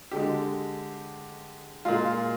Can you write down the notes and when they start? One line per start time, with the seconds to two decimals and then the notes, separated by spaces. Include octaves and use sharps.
0.11 D3 G#3 G4
1.85 A#2 G#3 F4